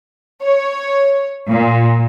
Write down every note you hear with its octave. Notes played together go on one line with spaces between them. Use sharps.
C#5
A#2